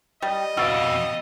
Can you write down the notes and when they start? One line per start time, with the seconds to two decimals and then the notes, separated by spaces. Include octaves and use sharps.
0.22 G3 D#5
0.57 F2 B2 F#4 F5 E6 A6 D7